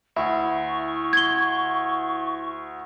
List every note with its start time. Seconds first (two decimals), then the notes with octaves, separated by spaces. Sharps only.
0.16 D2 E4 C#6
1.13 G#6 G7